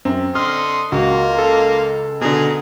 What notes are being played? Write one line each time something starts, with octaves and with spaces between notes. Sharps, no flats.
F#2 C4
D3 D#5 C6 F6
C#2 A#3 F4 F#4
A4
B2 D3 G#4 A#5